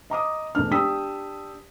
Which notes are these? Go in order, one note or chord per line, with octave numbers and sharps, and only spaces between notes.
D#5 A#5 D6 D#6
E1 A3 D4 F6
D4 G4 G5 D#6 E6 B6